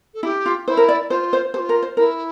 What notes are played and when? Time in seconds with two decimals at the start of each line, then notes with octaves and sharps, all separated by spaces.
0.14 A4
0.23 E4 G4
0.46 F4
0.67 E4 C5
0.77 A#4
0.89 D5
1.10 F4 C5
1.33 C5
1.54 G4 C5
1.59 F4
1.69 A#4
1.82 C5
1.97 E4 A#4